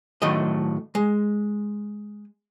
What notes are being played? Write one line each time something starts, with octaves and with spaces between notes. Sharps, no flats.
A2 D#3 F#3 A3 D#5
G#3